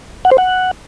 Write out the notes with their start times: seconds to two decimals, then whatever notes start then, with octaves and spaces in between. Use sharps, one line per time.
0.25 F#5
0.31 C5
0.38 F#5